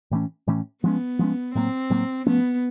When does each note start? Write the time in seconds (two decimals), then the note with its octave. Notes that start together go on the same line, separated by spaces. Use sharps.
0.11 A2 E3 A3 C#4
0.47 A2 E3 A3 C#4
0.83 F3 G#3 B3 C#4
1.19 F3 G#3 C#4
1.55 A2 F#3 A#3 C4
1.90 A2 F#3 A#3
2.26 F3 A3 B3 C#4